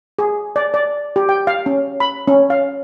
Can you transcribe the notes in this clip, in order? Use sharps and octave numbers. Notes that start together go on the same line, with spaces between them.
G#4
D5
D5
G4
G5
F5
C#4
B5
C#4
F5